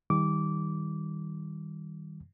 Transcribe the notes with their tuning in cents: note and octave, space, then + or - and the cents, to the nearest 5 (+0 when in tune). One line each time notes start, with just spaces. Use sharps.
D#3 +20 G3 +0 D6 -15